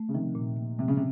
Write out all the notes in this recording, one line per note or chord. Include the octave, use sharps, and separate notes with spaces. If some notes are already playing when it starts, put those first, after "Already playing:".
Already playing: A3
C#3
C3 D#3 F3
A#2
A#3
C3 F3
C#3
C3